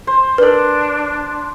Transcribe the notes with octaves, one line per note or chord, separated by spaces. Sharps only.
C5
D4 A#4 B4